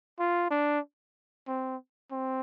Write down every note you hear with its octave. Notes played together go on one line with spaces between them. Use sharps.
F4
D4
C4
C4